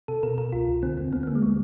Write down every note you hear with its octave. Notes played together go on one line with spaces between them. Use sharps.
C3 A4
B2 A#4
B2 A#4
C2 F4
C2
D3 C4
D#2 C4
D3 B3
B3
D3 A#3
G#3
G3